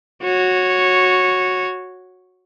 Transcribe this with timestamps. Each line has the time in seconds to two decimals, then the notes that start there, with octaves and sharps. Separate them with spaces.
0.23 F#4 C#5